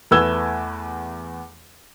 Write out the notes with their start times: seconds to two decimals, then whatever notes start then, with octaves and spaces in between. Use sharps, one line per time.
0.11 E2 A3 B4 E6 G#6 G7